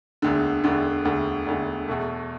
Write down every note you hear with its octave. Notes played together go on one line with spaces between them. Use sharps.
E1 D2 D3
E1 D2 D3
E1 D2 D3
E1 D2 D3
E2 B2 A3